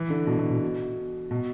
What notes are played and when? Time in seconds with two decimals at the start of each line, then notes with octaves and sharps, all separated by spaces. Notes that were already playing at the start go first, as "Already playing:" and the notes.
Already playing: E3
0.10 D3
0.27 B2
0.38 B2
0.50 B2
1.31 B2